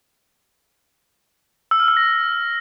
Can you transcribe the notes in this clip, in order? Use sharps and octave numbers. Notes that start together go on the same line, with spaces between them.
E6
F6
E6
A#6